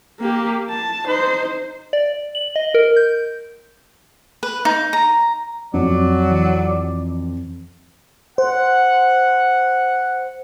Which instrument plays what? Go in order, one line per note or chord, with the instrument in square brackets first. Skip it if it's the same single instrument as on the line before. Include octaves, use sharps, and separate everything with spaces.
[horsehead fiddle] A#3 G4
A5
D#4 C5
[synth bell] D5
F#7
D#5
A#4
G6
[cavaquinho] B4
D#4
A#5
[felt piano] F2 [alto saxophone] F#3 [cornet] D5
[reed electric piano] E3
[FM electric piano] C5 [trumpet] F#5